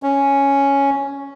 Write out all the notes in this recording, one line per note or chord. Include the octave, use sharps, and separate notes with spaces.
C#4